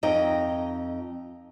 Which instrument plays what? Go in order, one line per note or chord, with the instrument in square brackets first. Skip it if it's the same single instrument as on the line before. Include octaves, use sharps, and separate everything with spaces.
[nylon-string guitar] F2 D#4 D#5 G5